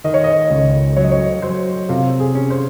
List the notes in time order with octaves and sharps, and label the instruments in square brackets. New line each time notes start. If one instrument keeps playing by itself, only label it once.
[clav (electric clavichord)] D#3 [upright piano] D#5
[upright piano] C#5
D#5
[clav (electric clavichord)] C#2 [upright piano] D#5
[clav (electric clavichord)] F#3 [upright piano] C#5
[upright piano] D#5
C#5
[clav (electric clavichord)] F#3 [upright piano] C5
[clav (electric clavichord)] C3 [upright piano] F4
[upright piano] G#4
[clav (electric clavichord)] C#4
[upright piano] C5